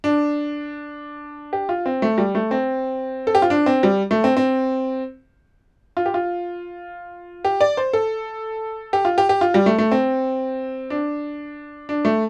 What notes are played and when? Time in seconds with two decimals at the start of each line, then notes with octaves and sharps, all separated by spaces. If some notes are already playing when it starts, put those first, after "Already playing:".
0.04 D4
1.53 G4
1.69 F4
1.86 C4
2.02 A3
2.18 G3
2.35 A3
2.51 C4
3.27 A4
3.35 G4
3.42 F4
3.50 D4
3.66 C4
3.83 G3
4.11 A3
4.24 C4
4.37 C4
5.97 F4
6.06 G4
6.14 F4
7.45 G4
7.61 D5
7.77 C5
7.93 A4
8.93 G4
9.05 F4
9.18 G4
9.29 G4
9.41 F4
9.54 G3
9.66 A3
9.79 A3
9.92 C4
10.90 D4
11.89 D4
12.05 A3